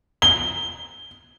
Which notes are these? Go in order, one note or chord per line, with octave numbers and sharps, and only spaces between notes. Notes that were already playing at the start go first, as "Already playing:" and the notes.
G7